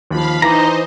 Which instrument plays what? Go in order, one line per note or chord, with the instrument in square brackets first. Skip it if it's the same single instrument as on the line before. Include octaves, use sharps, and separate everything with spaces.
[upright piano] D#2 F3 [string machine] F5 B5
[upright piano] E3 D6 [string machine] D#4 C5 D#5 [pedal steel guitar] A#5